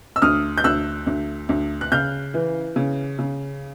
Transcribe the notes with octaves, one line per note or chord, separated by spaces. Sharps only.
E6
D2 D#6 F6
G6
D2 E6 F#6
D2
D2
F#6
C#3 F6 G6
E3
C#3
C#3